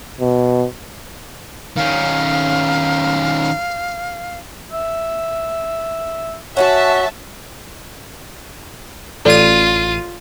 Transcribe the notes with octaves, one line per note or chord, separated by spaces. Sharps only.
B2
D#3 C#4 F5
E5
C#4 D#4 F#4 E5 F#5 A5
A1 F4 A4 D5 D#7